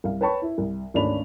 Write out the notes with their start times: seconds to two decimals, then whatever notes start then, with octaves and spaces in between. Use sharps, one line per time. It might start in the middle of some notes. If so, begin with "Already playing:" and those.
0.04 C2 F5
0.21 B4 C#5 G5 A5 B5 C#6
0.42 E4
0.58 C2
0.94 G#1 D2 C#4 D4 B5 F7